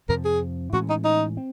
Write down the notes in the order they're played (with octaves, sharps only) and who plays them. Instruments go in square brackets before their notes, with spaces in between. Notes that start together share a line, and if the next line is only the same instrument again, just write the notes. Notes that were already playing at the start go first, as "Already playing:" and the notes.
[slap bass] F2 C3 F3 [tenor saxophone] A#4
[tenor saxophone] G#4
[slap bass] A2 E3 G#3 C#4 [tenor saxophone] F#4
[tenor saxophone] D#4
D#4
[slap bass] C4